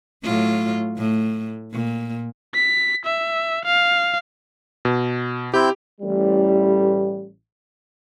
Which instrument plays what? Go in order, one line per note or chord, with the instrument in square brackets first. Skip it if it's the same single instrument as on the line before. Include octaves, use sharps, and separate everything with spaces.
[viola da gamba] A2 F#3 F4
A2
A#2
[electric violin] B6
E5
F5
[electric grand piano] B2
[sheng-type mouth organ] C4 E4 G6 [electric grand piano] G4
[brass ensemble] A1 G3